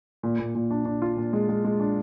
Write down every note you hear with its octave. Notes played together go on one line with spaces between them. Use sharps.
A#2
A#2
A#2
D4
D4
F4
A#2
G#3
G#3
G#3
D4